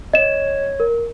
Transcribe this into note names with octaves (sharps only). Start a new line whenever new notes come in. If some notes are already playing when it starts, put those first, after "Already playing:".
C#5 D#5 E7
A#4